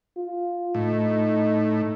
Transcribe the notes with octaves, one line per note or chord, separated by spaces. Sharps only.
F4
A2 D#4